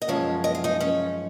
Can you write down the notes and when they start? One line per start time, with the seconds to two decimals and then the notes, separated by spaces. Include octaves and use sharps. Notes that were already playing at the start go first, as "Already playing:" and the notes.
0.02 D#5
0.08 F#2 F3 G#3 C#4 C#5
0.44 D#5
0.55 F5
0.64 D#4 D#5
0.80 C#4 C#5